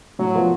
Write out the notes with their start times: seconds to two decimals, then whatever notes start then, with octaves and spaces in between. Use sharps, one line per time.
0.19 A2 F#3
0.35 F3 B3